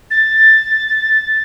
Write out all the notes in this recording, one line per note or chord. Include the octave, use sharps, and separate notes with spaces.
A6